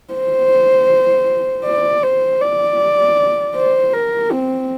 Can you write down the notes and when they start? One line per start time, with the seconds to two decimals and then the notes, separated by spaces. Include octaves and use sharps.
0.14 C5
1.66 D5
2.03 C5
2.42 D5
3.55 C5
3.94 A#4
4.31 C4